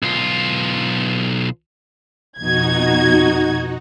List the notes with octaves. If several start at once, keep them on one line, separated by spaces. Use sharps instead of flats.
B1 F4
F2 B2 D#4 F#4 G#6